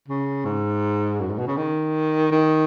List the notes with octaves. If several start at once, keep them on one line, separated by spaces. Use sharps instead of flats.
C#3
G#2
F#2
G#2
B2
C#3
D#3
D#3